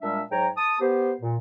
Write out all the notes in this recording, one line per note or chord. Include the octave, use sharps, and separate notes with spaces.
A#2 G3 G#3 D4 E5
G#2 F#3 C#5 G5 A#5
A5 D#6
B3 G4 C5
A#2